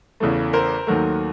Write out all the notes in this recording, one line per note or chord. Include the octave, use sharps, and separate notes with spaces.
E2 C#3 E3 A3
A#4 C5
D#2 D#3 F#3 A3